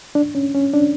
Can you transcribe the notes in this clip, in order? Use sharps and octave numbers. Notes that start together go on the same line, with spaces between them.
D4
C#4
C#4
D4